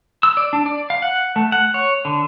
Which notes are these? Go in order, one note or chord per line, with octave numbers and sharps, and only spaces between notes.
E6
D5
D4
D5
F5
F#5
A3
F#5
C#5
D3